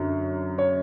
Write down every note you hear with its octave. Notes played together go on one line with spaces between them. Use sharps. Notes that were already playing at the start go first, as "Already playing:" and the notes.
Already playing: F#2 D3 F#3
C#5